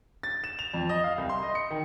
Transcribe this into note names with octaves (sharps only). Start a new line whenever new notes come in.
A6
E7
F7
F2
D#5
F5
C2
C6
D#5
C#7
D#3